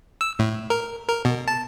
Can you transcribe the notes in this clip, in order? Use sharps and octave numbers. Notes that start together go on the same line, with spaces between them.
E6
A2
A#4
A#4
B2
A5